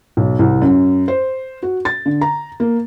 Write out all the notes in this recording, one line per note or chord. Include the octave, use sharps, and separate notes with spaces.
B1
C2
F#2
C5
F#4
A6
D3
A#5
A#3